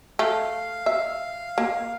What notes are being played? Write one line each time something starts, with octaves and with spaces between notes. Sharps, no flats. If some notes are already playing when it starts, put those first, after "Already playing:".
A3 F5
E5
A#3